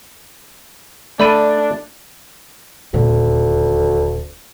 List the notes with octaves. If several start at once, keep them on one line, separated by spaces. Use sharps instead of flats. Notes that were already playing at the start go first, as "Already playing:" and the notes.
A3 D4 D5 B5 D#7
D#1 D2 A#2